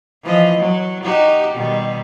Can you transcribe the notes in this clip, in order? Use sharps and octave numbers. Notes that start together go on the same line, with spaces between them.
E3 F3 D#5
F#3
D#4 F#4 G4
B2 D#3 G3